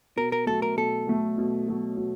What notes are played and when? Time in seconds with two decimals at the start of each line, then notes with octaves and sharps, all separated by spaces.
0.16 B2 A#4
0.32 A#4
0.47 F#3 A3 A4
0.62 A#4
0.77 B2 A4
1.07 F#3 A3
1.38 B2
1.68 F#3 A3
1.97 B2